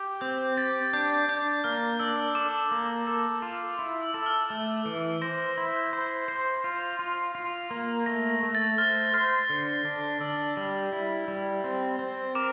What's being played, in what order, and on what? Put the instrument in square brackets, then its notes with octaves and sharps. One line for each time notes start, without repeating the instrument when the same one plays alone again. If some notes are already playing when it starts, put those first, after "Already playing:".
Already playing: [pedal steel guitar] G4
[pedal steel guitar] C4 [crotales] G6
[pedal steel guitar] G4 [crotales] A6
[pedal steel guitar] D4 [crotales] G6
[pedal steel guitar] D4 [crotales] G6
[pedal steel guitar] A#3 [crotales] F6
[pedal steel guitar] D4 [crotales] E6
[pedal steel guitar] A4 [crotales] D6
[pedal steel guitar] A#3
A4
F4
E4
[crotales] E6
[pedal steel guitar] A4
[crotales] F6
[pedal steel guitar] A3
E3
[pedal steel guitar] C5 [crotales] A#6
[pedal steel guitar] E4
C5
C5
F4
F4
F4
A#3
[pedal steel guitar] A3 [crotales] A#6
[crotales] A#6
[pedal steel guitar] A3
[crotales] A6
[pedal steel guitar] C5 [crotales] F6
[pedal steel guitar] C5 [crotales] F6
[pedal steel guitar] D3
D4
[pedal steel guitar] D4 [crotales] E6
[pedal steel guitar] G3
E4
G3
C4
C4
[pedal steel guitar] A#4 [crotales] D6